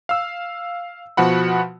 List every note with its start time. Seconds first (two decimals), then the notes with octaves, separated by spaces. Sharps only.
0.09 F5 E6
1.17 B2 F3 F#4 F#5 B5